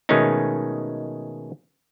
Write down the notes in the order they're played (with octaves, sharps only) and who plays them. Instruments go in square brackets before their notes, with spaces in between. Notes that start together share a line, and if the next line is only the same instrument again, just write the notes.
[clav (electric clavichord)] B2 D#3 G#3 A3 C#4 D#4